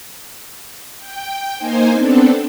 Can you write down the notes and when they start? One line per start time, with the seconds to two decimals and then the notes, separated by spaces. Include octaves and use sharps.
0.99 G5
1.57 A#3 D#4 C5 G#5
1.92 B3 C4 D4 A4